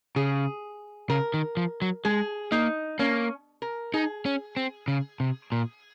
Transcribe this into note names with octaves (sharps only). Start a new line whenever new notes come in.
C#3 G#4
C#3 A#4
D#3
F3
F#3
G#3 G#4
A#3 D#4
A#3 C#4
A#4
D#4 G#4
C#4
C4
C#3
C3
A#2